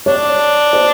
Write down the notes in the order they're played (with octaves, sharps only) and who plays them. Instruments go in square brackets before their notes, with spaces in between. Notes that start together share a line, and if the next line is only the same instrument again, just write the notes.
[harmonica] D4 [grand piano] C#5
[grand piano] C5